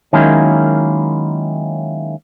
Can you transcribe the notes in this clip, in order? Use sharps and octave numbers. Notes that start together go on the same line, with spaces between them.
D#3 F#3 G#3 A#3 C#4 E4